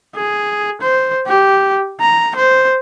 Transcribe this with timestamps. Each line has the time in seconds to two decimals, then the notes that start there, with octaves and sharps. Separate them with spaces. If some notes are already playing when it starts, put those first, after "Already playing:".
0.16 G#4
0.81 C5
1.27 G4
2.01 A#5
2.36 C5